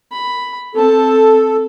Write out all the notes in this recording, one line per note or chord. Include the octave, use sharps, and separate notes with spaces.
B5
C4 A4 A5